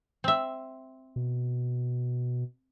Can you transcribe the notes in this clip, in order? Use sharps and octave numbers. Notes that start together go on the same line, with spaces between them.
C4 E5
B2